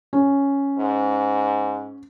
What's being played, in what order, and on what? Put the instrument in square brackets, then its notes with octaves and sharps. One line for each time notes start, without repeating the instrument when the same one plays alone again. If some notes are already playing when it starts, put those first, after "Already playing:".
[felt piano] C#4
[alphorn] G#2